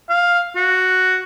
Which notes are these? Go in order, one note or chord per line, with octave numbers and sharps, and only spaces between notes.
F5
F#4